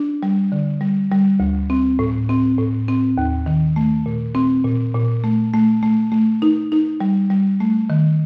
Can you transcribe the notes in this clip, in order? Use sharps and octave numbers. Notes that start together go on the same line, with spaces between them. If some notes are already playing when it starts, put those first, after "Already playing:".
Already playing: D4
G3
D3
G3
G3
D2
C4
A2
C4
A2
C4
D#2
D#3
A3
A#2
C4
A#2
A#2
A3
A3
A3
A3
D#4
D#4
G3
G3
A3
D#3